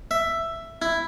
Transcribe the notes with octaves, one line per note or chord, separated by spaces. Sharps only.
E5
E4